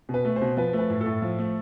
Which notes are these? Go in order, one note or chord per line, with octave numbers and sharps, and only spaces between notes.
B2
B4
A3
C5
B2
F3 B4
A3
B4
A2
A4
A2
F3
A3